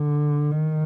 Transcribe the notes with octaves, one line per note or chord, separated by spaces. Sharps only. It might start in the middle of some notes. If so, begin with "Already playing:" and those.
Already playing: D3
D#3